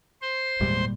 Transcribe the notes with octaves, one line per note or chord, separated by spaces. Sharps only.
C5 C6
G#1 E2 A#2 G3 G#3 A#3